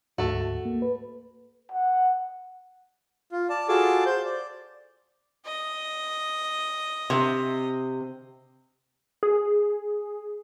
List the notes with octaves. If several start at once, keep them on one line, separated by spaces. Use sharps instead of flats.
D2 G#2 A3 F#4
A#3
B4
F#5
F4
D5 A5
F4 F#4 G#4 A4 A5 D6
C5 G6
D5
D#5
C3
G#4